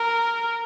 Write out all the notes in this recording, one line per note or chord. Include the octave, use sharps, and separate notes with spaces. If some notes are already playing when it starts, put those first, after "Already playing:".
Already playing: A#4